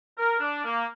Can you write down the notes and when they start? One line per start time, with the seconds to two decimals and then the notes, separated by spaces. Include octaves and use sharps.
0.18 A#4
0.40 D4
0.64 A#3